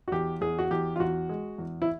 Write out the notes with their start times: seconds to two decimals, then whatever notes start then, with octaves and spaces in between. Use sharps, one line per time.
0.08 F#4
0.12 E2 G4
0.41 E2 G#4
0.59 F#4
0.71 E2 G4
0.96 F4
1.00 E2 F#4
1.29 G#3
1.58 E2
1.82 E4